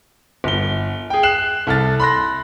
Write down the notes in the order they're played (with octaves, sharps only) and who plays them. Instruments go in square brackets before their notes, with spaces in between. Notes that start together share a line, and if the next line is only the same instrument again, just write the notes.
[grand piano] G1 G7
G#4 G5
F#6 C7 E7 F#7
C2 A4 F6 A6
B5 C6 F#6 A#6